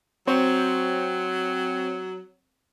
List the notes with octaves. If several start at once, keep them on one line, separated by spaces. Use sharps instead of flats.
F#3 C4 C5 C#5